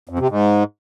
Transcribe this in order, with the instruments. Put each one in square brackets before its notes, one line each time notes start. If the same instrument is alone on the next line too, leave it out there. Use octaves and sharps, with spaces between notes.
[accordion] F2
C3
G#2